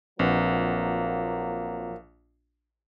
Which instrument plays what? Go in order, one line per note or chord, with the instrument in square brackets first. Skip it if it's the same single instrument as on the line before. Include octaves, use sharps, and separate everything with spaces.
[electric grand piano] A#1 [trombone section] F3 F#3 A#3 [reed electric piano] C4 B4 F#5